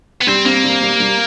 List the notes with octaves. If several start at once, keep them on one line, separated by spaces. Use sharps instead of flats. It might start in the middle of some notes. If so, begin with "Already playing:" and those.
B3
G3 C4
A#3 C4
G3
G3
G3